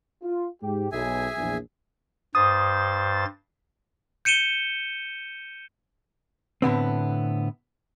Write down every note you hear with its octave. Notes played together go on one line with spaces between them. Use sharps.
F4
G#2 G4
B1 G#4 E5 G#5
A#1 E2
G2 C5 D#6 A6
G6 C#7 D#7 E7 G7
A2 D3 B3 C4